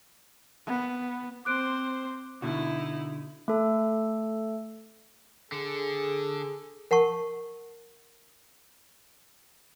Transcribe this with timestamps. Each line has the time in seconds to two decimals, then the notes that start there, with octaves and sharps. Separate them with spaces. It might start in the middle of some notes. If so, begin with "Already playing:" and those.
0.67 B3
1.45 C4 C5 D6 F#6 D7
2.42 B2 D3 D#4 E4 F#4
3.48 A3 A4
5.52 D3 G#4 A4
6.91 A#4 F#5 A5 C#6